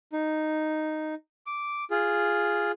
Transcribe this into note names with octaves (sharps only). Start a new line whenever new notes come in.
D#4
D6
F4 G#4